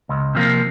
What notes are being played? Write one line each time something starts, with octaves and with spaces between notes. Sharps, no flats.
C#2
C3 F3 A#3